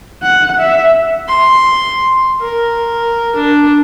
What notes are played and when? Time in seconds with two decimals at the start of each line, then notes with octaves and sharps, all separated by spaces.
0.23 F#5
0.60 E5
1.28 C6
2.41 A#4
3.35 D4